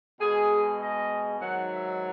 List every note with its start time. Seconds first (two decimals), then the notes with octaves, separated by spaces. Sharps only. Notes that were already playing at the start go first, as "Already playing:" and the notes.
0.20 B2 G#3 G#4
0.79 D#5
1.39 G#2 D#3 F#3 F#5
1.70 E5